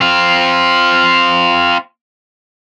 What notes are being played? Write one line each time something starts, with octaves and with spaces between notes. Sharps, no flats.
C4 F4